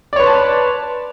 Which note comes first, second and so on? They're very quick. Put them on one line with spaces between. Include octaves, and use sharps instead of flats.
D5 C#5 B4 C6 A5